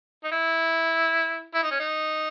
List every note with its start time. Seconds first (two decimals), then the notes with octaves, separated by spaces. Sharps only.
0.24 D#4
0.32 E4
1.54 E4
1.63 D#4
1.71 C#4
1.80 D#4